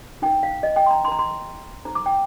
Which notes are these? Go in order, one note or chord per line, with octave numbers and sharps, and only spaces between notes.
D#4 A#4 G5
F5
D#5
G5
C6
A#5
D#4 A#4 A#5 C6
C6
D#4 A4 C5 A#5
D6
G5